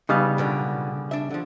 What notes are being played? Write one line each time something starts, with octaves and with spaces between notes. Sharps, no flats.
C#3 G3 B3 D#4 D#5 F5
B1 A#2 D3
D4 E5
D3 F3